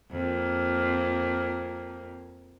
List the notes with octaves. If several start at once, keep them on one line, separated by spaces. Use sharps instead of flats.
F2 A#3